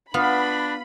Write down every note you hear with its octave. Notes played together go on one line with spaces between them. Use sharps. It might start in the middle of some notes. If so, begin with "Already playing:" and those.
B3 D4 F4 B5